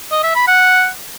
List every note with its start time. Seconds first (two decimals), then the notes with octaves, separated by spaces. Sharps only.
0.12 D#5
0.24 E5
0.35 B5
0.47 F#5